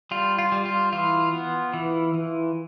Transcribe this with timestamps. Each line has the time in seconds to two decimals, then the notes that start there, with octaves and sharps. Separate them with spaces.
0.11 G3 F4
0.38 F4
0.52 G3
0.65 F4
0.92 E3 F4
1.33 B3
1.73 E3
2.14 E3